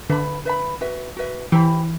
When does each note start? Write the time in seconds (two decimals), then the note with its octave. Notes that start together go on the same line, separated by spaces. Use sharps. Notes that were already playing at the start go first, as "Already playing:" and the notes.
0.09 D3 B4 E5 B5
0.45 B4 E5 B5
0.81 F#4 B4 E5
1.17 F#4 B4 E5
1.52 E3 G4 C5 E5 B5